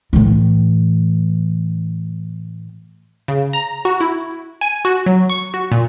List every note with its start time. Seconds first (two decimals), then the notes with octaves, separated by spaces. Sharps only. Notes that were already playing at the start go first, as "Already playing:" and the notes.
0.13 A2 E3
3.28 C#3
3.53 A#5
3.85 F#4
4.01 E4
4.61 G#5
4.85 F#4
5.06 F#3
5.30 C#6
5.54 F#4
5.72 A#2